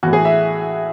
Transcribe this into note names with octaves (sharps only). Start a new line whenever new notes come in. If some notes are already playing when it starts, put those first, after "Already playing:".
A2 E3 F#4
G#4
E5